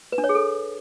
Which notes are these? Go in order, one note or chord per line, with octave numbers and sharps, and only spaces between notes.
B4
D4
C#5
G#4
A4